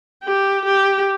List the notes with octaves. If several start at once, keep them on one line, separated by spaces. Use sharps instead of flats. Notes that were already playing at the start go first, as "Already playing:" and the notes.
G4
G4